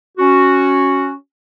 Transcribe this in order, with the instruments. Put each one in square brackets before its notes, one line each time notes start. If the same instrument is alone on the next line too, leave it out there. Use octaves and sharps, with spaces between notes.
[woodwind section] C#4 F#4